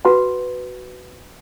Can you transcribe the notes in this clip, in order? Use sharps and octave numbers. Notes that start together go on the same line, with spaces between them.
F#4 B4 F#5 B5